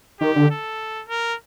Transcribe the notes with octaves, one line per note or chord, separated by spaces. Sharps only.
D#3 G4
D3
A4
A#4